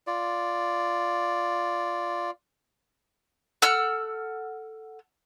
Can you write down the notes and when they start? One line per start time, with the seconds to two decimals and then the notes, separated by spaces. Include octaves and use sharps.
0.07 F4 D5
3.62 A4 F#5 E6 F6